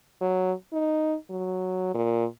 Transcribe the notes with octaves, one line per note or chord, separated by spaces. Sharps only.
F#3
D#4
F#3
A#2